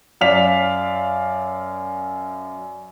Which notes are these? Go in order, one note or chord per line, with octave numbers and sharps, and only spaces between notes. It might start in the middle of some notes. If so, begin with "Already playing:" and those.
F#2 D5 F5 B6 F7